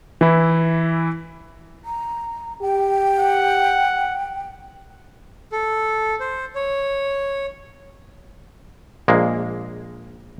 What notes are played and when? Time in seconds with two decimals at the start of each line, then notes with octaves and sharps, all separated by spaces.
0.21 E3 E4
1.85 A#5
2.61 G4 G5
3.19 F#5
5.52 A4
6.20 C5
6.55 C#5
9.08 A#1 G#3 A#3